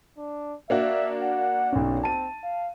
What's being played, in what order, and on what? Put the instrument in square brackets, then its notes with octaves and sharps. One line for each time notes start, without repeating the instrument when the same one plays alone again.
[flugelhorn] D4
[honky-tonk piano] A#3 D4 F#4 [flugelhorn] E5
[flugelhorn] F#5
[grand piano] B1 C#4
[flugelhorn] C4 [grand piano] A5 D#7
[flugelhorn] F5